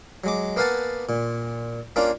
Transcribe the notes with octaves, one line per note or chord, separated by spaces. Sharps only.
F#3 G#3 D6
A#3 B3 F5 F#5 G#5 A5
A#2
A#3 C#4 D4 F4